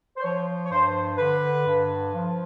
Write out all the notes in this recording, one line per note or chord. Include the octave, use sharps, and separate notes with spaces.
C5
F3 C#5
C#5
G2 C5
D3 B4
G2
F3